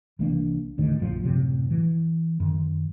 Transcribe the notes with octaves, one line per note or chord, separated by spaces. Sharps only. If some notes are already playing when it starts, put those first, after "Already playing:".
C2 E3 A#3 D4
D2 A2 D#3
A#1 F#2 D3 F3
F#2 A2 C3 F#3
E3
F#2 D#3